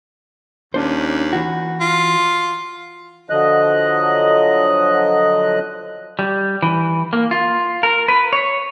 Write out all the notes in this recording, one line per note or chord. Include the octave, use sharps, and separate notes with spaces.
D#2 C#4 D4 C5
E3 F#4
F4
D3 F3 F#3 D#5 F#6
G3
E3
A#3
F4
A#4
B4
C#5